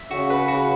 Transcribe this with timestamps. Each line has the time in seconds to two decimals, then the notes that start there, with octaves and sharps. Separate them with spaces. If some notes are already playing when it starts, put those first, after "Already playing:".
Already playing: E5
0.11 C#3 F#4
0.30 B4
0.48 F#4